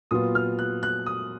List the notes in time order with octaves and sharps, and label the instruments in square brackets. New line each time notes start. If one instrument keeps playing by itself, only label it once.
[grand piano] A#2 F#3 B3 F4 D#6
F6
F#6
F#6
D#6